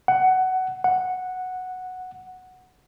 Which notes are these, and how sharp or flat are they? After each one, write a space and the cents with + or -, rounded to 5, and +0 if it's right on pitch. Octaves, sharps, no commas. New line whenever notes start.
F#5 +15
F#5 -5